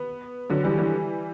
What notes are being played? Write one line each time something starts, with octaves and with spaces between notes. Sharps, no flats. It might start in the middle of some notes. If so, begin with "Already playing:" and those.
Already playing: B3
D3 F#3
E3 G3
E3 G3